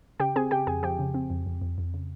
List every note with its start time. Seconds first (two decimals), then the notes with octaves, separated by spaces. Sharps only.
0.20 C#3 G4 G5
0.36 C4 G#4 G#5
0.51 C#3 G4 G5
0.67 F2 G#4 G#5
0.83 F3 G4 G5
0.99 C#3
1.14 C4
1.30 F2
1.46 F2
1.61 F2
1.78 F2
1.94 C#3